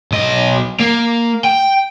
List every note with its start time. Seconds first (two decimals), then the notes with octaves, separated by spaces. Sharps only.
0.12 B1 D#5
0.80 A#3
1.44 G5